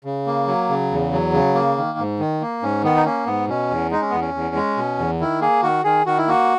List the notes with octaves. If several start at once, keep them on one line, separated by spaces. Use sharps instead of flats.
C#3
A#3
F#3
C#3
E2
F#3
C#3
A#3
D#3
G#2
D#3
A#3
G#2 C#4
D#3 B3
D#4
A#3 C#4
G#2 B3
B2 C#4
E2
G#3 D#4
C#4
E2 B3
C#4
E2
G#3
B2
E2
D#3 E4
A#3 G#4
D#3 F#4
D#3 G#4
D#3 F#4
E4
A#3 F#4